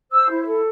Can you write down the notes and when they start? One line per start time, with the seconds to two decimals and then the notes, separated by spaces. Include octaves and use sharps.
0.11 C5 E6
0.29 E4
0.46 A4